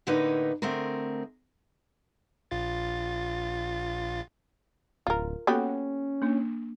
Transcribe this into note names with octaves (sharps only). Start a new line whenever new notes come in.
A2 D3 A#3 D#4 B4 C#5
D3 A3 C4 G#4 A#4
A#1 F4 A6
D1 F4 A#4
A#3 B3 C#4 F#4 G4 A4
A#3 D4